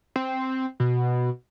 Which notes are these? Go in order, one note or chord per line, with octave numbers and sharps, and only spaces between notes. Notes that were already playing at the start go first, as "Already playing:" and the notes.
C4
B2